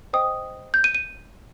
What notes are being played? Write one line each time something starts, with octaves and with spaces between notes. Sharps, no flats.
C5 D#5 G5 D#6
G6
D#7
D#7